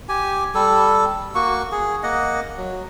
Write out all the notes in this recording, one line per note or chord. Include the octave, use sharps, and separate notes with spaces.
G4 G#5
G3 A4
A#3 F#4 C#6
G#4
A#3 D#5 F#5
F#3